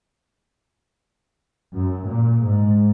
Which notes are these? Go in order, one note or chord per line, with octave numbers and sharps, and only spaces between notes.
F#2
A#2
G#2